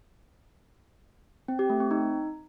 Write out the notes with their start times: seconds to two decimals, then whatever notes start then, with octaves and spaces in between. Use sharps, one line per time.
1.48 C4
1.59 G4
1.70 A3
1.80 C4
1.91 D#4